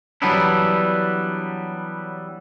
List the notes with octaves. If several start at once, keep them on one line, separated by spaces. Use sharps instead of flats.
E3 F#3 G3 B3 D4 E4